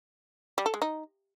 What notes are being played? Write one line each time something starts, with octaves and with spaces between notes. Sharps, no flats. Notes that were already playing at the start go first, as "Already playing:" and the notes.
G3
A4
G#3
D#4